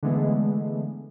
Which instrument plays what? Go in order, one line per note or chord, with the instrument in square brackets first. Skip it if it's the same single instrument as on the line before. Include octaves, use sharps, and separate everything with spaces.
[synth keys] D3 E3 G#3 A3 B3